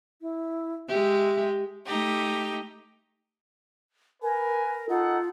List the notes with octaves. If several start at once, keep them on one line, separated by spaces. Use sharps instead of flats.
E4
G#3 G4 E5
A3 D#4 G4
A#4 B4 G#5
D#4 F4 A4 F#5